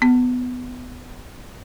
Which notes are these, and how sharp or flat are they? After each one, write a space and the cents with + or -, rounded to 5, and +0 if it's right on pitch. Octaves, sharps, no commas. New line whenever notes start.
B3 +15